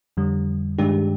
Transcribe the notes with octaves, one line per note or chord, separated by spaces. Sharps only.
F2 D3 G3
G2 D#3 G#3 D4 G4